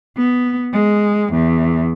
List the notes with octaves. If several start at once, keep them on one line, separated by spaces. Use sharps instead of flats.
B3
G#3
E2